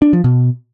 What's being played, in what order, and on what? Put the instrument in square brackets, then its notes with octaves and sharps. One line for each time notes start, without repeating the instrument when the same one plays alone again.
[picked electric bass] D4
F3
B2